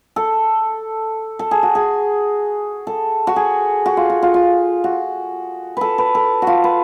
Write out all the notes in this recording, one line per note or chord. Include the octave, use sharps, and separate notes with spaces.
A4
A4
G#4
F#4
G#4
A4
F#4
G#4
F#4
F4
F#4
F4
F4
F#4
A4 B4
B4
A4
F#4
F4
B4